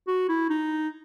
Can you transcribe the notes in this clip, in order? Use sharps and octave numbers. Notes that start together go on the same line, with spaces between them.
F#4
E4
D#4